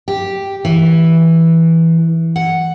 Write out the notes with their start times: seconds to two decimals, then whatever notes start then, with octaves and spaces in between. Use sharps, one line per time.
0.08 G4
0.65 E3
2.36 F#5